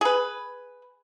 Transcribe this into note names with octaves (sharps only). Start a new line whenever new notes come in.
G#4 B4